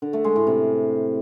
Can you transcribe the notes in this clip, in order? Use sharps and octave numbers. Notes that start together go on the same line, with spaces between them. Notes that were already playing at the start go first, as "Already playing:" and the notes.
D3
A3
G#3
A2
C3